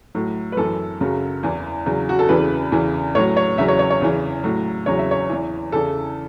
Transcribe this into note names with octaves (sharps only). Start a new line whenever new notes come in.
A2 F#3
B4
F#2 E3 A4
F#2 C#3 F#3
E2 E3
E2 C#3 F#3
F#4
A4
E2 C#3 E3 B4
E2 C#3 E3
A2 F#3 C#5
C#5
E2 C#3 F#3 E5
C#5
C#5
C#5
E2 C#3 E3
A2 F#3
E2 C#3 F#3 C#5
E5
C#5
E2 E3
E2 C#3 E3 A4